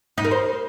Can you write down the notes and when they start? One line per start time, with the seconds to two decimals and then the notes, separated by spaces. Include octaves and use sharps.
0.18 D#4
0.24 A#4
0.31 C5